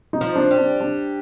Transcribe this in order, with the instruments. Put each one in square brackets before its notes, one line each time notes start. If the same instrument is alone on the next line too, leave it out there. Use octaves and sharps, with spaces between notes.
[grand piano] D#4
[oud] F3
[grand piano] D4
[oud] G3
[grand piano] D4
D4